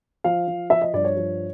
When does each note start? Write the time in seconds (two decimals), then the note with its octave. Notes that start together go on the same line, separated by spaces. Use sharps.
0.24 F3 F5
0.48 F3
0.70 F3 E5
0.82 D#5
0.93 G2 D5
1.04 C#5
1.17 F3